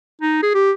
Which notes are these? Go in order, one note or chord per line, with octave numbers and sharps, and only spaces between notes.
D#4
G#4
G4